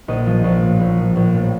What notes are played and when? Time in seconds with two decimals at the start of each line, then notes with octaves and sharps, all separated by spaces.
0.08 A#1 D#5
0.26 F3
0.44 A#1
0.62 A2
0.80 A#1
0.98 F3
1.16 A#1
1.34 A2